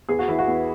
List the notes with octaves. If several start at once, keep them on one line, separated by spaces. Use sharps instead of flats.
E2 G#4
F#4
E3 E4
F#4
E2